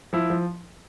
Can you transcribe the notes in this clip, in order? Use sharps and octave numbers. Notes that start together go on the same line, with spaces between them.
F3 E4
F3